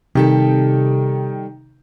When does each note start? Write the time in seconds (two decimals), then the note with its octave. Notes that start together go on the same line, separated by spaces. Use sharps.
0.15 C3 D#3 G3 G4 A4